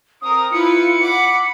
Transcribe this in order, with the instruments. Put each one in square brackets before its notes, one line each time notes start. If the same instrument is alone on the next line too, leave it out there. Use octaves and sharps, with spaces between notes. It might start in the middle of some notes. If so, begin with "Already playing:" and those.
[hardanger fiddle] C4 A#4 [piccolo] D#6
[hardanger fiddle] E4 B4 [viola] F4 [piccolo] C#7
[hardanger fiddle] F#5 D6 [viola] B5